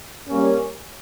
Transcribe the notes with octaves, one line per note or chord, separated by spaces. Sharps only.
G3 A#3 C#4